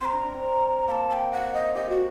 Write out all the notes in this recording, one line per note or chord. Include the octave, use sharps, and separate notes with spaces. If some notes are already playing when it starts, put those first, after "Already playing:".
C4 A#5 C6
D4
D4
C4
A#3 A5 A#5
A5
G5
F#5
D#5
G4 D#5
F#4